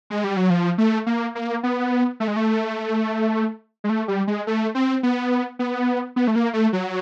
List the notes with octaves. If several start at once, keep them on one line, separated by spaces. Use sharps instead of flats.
G#3
G3
F#3
F3
A3
A#3
A#3
B3
A3
G#3
A3
G#3
A3
G3
G#3
A3
C4
B3
B3
B3
A3
A#3
A3
F#3